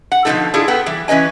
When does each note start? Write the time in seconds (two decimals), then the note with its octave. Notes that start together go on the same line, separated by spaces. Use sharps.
0.12 F#5
0.25 B2 D3 F3 G#3 D#4 A4
0.54 D4 E4 F4 G#4 A4
0.68 B3 A4 G5
0.86 E3 G3
1.08 E3 C#4 B4 D#5 G#5